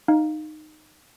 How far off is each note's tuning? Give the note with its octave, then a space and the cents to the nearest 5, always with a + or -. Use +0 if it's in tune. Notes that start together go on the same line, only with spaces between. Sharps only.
D#4 -15 F5 +5